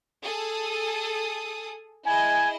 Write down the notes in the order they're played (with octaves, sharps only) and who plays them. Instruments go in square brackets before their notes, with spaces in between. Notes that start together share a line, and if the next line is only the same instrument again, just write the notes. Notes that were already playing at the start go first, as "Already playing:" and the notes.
[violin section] G#4 A4 D#6
[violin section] E4 G#4 D#5 [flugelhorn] G#5